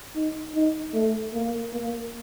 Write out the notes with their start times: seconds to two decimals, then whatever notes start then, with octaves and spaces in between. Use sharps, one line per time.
0.15 D#4
0.55 D#4
0.94 A3
1.34 A#3
1.74 A#3